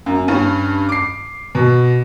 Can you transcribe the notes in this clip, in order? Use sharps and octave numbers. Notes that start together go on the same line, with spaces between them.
F#2
G2 C#4
D6 C7
B2